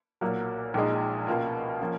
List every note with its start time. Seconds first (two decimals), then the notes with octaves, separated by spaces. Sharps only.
0.21 B1 A#2 F#3 A#3
0.74 A#1 A#2 G#3 D#4
1.27 C#2 B2 A#3 F4
1.80 F3 A#3 C#4